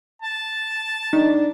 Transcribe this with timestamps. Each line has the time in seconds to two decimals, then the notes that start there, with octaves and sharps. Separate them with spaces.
0.22 A5
1.13 D4 D#4